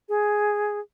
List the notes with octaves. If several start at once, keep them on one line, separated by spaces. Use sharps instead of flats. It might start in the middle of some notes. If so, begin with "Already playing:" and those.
G#4